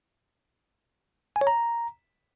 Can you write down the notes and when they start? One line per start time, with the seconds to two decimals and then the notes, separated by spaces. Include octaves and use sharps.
1.36 G#5
1.41 C#5
1.47 A#5